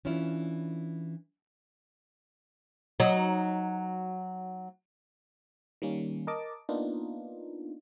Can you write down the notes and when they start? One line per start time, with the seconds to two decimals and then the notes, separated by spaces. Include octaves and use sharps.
0.05 E3 C#4 D4 E4 F4
3.00 F#3 D#4
5.82 D#3 G3 A#3 C#4
6.27 A#4 D#5 A5 D6
6.69 A#3 B3 D4 D#4 F4